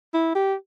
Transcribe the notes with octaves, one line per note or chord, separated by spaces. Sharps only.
E4
G4